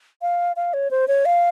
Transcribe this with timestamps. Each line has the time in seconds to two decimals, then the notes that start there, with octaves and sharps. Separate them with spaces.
0.22 F5
0.56 F5
0.73 C#5
0.91 C5
1.08 C#5
1.25 F5